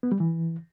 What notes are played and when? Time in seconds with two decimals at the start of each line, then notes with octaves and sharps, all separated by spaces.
0.03 B3
0.12 G3
0.20 E3